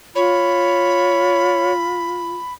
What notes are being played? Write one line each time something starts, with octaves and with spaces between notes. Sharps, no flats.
F4 C#5 B5